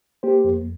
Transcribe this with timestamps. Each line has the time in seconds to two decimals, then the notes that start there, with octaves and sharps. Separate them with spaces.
0.23 A#3 G4 C5
0.44 F2